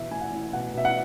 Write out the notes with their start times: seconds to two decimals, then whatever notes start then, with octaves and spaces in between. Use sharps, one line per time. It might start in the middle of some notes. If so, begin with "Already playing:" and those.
Already playing: B2 E3 E5
0.10 A2 G#5
0.21 F#5
0.32 A2
0.53 B2 F#5
0.74 B2 E5
0.85 F#5